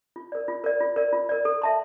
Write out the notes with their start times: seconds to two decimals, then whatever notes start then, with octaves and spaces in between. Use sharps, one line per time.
0.16 F4
0.32 A#4 D5
0.48 F4
0.64 A#4 D5
0.81 F4
0.96 A#4 D5
1.13 F4
1.29 A#4 D5
1.45 A4
1.62 E5 A5 C6